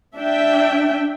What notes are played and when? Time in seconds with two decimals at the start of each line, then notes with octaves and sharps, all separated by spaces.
0.17 D4 E5 G5